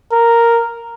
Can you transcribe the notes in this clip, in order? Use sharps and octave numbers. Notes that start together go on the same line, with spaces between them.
A#4